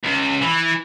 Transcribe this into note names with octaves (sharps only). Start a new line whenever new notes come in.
C#2
E3